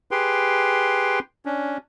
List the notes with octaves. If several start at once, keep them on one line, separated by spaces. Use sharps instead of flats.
G4 G#4 B4 G5 C6
C#4 D4